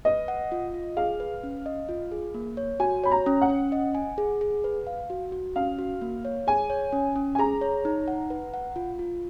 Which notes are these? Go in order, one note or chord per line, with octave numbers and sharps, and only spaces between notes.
B4 D#5
F#5
F4
F4
G#4 F5
B4
C#4
D#5
F4
G#4
A#3
C#5
F#4 G#5
C#5 B5
A#5
C#4
F#5
C#4
D#5
G#5
G#4
G#4
B4
F5
F#4
F#4
C#4 F5
F#4
A#3
C#5
G#4 G#5
C#5
C#4
C#4
G#5
G#4 A#5
C#5
D#4
F#5
B4
F#5
F4
F4